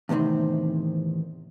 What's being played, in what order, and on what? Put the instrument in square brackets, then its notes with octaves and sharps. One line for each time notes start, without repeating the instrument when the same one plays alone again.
[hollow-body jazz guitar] E2 A2 C3 D#3 C4